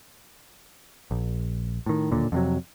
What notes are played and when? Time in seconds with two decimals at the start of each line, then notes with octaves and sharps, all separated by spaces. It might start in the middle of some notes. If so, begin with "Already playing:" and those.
1.11 A#1
1.86 A2 D#3
2.11 D1 D#2 A#2 D3
2.32 F2 C3 F#3